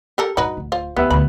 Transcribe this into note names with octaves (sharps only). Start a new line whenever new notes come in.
G4 A4 A#4
G2 D#4 F#4 B4
D1
F4 C5
D#2 B3 G4 E5
D2 B5